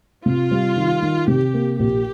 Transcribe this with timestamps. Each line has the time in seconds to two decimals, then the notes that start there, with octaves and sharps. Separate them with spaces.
0.25 C3 F4
0.51 G3
0.76 D#3
1.02 D#3
1.27 C3 G4
1.54 A#3
1.79 A#1 G4